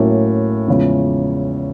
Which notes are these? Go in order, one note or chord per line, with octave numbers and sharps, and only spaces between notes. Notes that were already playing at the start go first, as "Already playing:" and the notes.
Already playing: A2 F#3 A#3 C#4
E2 C#3 F3 G#3